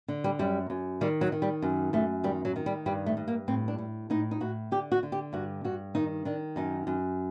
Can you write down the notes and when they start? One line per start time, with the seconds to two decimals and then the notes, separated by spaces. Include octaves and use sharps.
0.08 D3
0.24 G3
0.39 F#2 G3
0.70 F#2
1.01 D#3 G3
1.21 F#3
1.32 D#3
1.42 G3
1.62 F#2
1.93 F#2 A3
2.24 D#3 G3
2.45 F#3
2.56 D#3
2.66 G3
2.86 G2 G3
3.06 A3
3.17 G2
3.28 A#3
3.48 A2 C4
3.68 D4
3.78 A2
4.10 A2 D#4
4.31 D#4
4.40 A2 F#4
4.71 D3 G4
4.92 F#4
5.03 D3
5.12 G4
5.33 G2 F#4
5.64 G2 F#4
5.95 D#3 D#4
6.25 D#3 D4
6.56 F#2 D#4
6.87 F#2